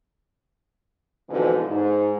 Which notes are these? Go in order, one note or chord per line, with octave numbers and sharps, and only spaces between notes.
F2 G#2 B2 D3 E3
G#2